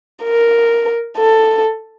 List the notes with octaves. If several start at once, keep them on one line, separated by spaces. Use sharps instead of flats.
A#4
A4